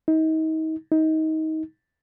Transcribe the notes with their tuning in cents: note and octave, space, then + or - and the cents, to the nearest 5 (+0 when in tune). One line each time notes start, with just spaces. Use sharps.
D#4 +35
D#4 +25